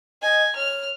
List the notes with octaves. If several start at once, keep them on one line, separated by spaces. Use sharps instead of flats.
D#5 G#5
C#5 F6